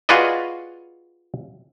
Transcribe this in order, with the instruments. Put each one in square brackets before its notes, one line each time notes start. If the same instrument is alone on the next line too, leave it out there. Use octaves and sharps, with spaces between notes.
[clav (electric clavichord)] F4 F#4 G#4 B4 D5 D#5